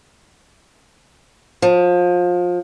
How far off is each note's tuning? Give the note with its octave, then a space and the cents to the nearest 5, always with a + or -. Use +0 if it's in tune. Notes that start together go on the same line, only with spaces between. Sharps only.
F3 +25